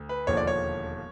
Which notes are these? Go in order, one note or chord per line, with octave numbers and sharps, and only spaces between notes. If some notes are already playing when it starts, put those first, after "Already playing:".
Already playing: D2
B4
E1 D#2 D3 F3 C#5
D5
C#5